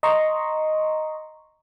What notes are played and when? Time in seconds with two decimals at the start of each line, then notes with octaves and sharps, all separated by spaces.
0.03 D#5 A#5 C6 C#6